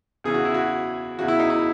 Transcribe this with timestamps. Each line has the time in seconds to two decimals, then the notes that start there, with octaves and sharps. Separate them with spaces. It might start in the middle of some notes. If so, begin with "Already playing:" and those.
0.24 E2 C#3 E3 G#4
0.34 F#4
0.45 E4
0.54 F#4
1.19 E2 C#3 E3 F#4
1.28 E4
1.39 D#4
1.50 E4